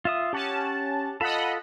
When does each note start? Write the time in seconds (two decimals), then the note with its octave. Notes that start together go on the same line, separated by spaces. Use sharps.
0.05 F4 E5 D#6
0.33 C#4 G4 F#5 A5
1.21 F4 A4 D#5 F#5 A5 B5